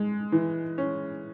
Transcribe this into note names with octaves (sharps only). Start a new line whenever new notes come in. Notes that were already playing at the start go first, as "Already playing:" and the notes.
Already playing: G#3
E3
C#4